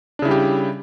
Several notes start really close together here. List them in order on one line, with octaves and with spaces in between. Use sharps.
D4 C#3 E4 G3 G4